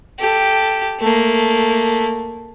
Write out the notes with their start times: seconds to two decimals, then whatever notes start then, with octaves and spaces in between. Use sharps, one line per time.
0.19 G4 A4
1.00 A3 A#3